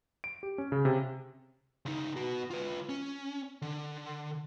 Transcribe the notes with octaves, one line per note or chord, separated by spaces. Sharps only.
D7
G4
C#4
C#3
C3
C#2 D#4
B3 F#4
F4 B4
C#4
D3